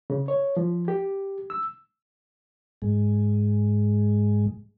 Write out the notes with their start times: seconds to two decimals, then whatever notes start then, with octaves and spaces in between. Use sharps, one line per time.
0.10 C#3
0.28 C#5
0.57 F3
0.88 G4
1.50 E6
2.82 G#2 G#3